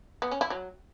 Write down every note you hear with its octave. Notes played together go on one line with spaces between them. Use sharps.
B3
C#4
E4
F#3